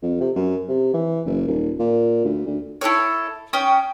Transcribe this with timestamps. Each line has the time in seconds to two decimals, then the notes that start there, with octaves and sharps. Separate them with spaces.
0.02 F2
0.20 C3
0.36 F#2
0.68 C3
0.94 E3
1.26 F#1
1.48 D#1
1.79 A#2
2.25 D2
2.47 D2
2.81 E4 F#4 A4 C#5
3.53 C#4 G5 D#6